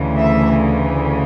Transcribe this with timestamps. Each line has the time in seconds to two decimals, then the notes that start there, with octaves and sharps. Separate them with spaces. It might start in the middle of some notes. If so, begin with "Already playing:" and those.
Already playing: D2 C#3 E3
0.17 E5